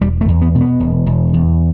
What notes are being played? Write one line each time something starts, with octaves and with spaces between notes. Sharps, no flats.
E1 G3
A3
E2
B3
B2
B3
E1
E1
E2